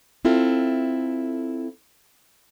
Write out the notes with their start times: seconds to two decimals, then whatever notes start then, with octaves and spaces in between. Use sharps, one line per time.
0.25 C4 E4 F4 A4